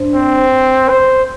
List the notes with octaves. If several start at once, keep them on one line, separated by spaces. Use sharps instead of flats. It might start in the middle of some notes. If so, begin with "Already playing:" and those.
Already playing: G2 D4 C5
C4
C5